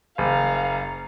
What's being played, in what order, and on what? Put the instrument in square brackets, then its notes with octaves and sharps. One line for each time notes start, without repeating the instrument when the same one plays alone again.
[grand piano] F#1 [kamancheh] F5 A#5